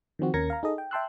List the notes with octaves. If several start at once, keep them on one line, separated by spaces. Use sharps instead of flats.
D#3 F3 C4 F#4
D#2 C#4 A#4 G#6 A#6 C#7
F5 A#5
D#4 G#4 A4 D#5
G5
E5 G5 A5 C6 E6 F#6